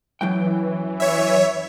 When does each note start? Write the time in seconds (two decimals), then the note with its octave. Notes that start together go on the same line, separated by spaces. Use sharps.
0.21 F#2 E3 F#3 G5
1.00 C#5 E5